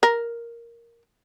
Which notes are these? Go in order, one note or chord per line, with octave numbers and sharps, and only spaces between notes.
A#4